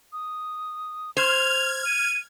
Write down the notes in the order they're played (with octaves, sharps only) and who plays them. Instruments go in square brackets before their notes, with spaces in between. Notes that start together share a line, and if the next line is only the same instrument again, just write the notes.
[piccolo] D#6
[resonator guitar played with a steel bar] C5 [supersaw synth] F6 G#6 [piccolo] F7
[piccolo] D#7